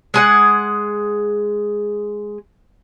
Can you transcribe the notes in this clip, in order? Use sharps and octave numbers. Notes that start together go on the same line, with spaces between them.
G#3 G#4 F#5